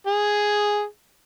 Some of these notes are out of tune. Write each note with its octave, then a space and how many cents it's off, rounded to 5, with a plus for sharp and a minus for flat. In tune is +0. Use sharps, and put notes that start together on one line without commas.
G#4 +0